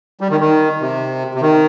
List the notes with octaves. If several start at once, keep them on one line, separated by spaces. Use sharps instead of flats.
G3
D#3
D#3
C3
C3
D#3